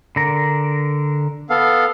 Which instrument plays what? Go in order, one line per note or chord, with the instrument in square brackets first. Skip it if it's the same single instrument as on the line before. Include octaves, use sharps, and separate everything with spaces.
[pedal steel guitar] D3 A#4
[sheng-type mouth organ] B3 A4 F5